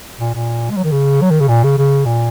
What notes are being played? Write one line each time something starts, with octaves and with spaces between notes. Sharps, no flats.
A#2
A#2
G#3
F#3
D#3
C#3
F#3
D#3
C#3
A#2
C#3
C#3
A#2